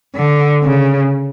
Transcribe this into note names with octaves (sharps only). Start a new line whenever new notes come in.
D3
C#3